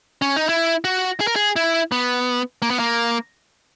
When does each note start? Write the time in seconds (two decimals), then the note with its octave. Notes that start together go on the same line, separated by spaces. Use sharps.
0.22 C#4
0.36 D#4
0.49 E4
0.84 F#4
1.20 G#4
1.27 A#4
1.36 G#4
1.56 E4
1.92 B3
2.62 A#3
2.70 B3
2.79 A#3